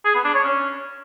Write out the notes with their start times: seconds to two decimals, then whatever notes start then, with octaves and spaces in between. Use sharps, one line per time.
0.05 G#4
0.15 B3
0.25 D4
0.34 C#5
0.44 C#4